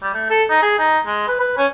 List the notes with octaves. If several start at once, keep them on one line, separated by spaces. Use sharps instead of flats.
G3
A3
A4
D#4
G#4
D#4
G#3
B4
B4
C#4